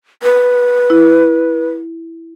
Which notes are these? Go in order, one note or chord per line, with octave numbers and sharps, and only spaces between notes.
B4
E4